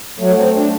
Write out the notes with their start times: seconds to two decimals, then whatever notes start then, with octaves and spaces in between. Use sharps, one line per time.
0.19 F#3 A3
0.37 C4
0.55 D4